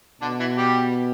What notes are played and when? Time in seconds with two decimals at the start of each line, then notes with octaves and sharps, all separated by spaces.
0.21 B2 D3 D4
0.40 E3 E4
0.57 G3 G4